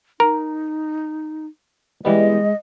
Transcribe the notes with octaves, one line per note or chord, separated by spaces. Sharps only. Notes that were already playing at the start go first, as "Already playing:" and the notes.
D#4 A#4
E3 G3 G#3 B3 D#5